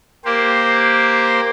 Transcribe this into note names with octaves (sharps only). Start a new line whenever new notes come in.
A#3 G4 C5